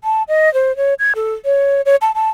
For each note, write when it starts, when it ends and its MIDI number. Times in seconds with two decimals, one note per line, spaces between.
0.04 0.23 81
0.28 0.52 75
0.54 0.75 72
0.77 0.94 73
0.99 1.12 92
1.15 1.34 69
1.45 1.81 73
1.86 1.96 73
2.01 2.11 81
2.15 2.30 81